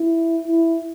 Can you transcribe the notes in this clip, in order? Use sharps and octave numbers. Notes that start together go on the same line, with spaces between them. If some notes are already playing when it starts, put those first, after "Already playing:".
Already playing: E4
E4